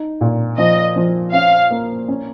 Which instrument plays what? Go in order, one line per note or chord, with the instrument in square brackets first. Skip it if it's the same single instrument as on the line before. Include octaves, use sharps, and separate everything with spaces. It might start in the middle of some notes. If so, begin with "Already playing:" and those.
Already playing: [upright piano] D#4
A#2
[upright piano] F3 [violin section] D#5
[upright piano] F3
[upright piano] C#4 [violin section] F5
[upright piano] A#3
C#4